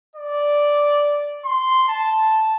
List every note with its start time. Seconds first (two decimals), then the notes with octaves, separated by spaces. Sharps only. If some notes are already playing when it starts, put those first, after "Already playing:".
0.15 D5
1.44 C6
1.88 A5